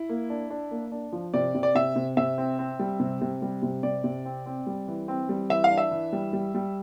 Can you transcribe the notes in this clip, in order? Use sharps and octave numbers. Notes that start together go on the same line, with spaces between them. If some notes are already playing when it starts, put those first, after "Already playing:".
Already playing: E4
A#3
D4
D4
A#3
D4
F3
C3 D5
C3
D5
C3 E5
C3
C3 E5
C4
C4
G3
C3
C3
G3
C3
C3 D5
C3
C4
C4
G3
E3
C4
G3
E3 E5
F5
D4
E5
E3
G3
G3
G3